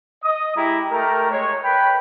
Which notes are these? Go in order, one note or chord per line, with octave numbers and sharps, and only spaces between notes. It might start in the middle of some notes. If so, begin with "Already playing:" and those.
D#5 D#6
G#3 E4 G4 A#5
A3 G4 A#4
G#3 C#5
B4 G5 B5